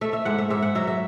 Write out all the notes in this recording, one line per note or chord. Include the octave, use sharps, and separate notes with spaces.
A3 E5
E5
G#2 F#5
E5
G#2 E5
F#5
F#3 E5
E5